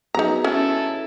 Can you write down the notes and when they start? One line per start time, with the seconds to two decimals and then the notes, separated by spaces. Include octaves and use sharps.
0.15 F#3 B3 D#4 G#4 A#5
0.44 C#4 E4 A4